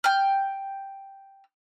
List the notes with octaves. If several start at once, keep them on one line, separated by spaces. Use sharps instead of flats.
G5 F6